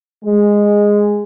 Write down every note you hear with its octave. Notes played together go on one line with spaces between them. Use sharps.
G#3